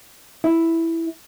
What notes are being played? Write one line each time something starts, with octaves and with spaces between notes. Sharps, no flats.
E4